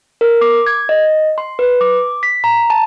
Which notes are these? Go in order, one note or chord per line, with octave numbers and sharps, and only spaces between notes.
A#4
D6
G#6
D#5
C6
B4
D6
B6
A#5
A5